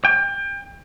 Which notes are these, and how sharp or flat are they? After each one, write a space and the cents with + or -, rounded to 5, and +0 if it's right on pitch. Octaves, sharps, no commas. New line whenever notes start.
G5 +30